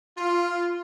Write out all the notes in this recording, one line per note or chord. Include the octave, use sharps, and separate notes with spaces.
F4